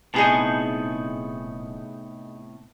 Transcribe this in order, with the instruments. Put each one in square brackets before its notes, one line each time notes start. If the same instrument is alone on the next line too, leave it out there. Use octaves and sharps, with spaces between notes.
[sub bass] D#1 [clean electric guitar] A2 C3 B3 [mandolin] D#4 G#4 A5